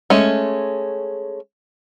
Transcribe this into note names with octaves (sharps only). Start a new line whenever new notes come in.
G#3 A3 C#4